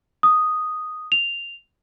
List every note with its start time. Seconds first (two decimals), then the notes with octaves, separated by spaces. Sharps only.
0.23 D#6
1.12 F7